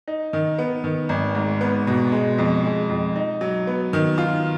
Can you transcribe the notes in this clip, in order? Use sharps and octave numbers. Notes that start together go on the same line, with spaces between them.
D#4
D#3
B3
D#3
G#1
G#2
B3
B2
G#3
F2
G#3
F2
D#4
F#3
B3
D#3
F4